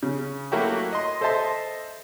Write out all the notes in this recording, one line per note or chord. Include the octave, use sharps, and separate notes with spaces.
C#3
F#3 A3 A#3 E4 F#4 G4
D#5 C6
A4 C5 D#5 E5 A5 C6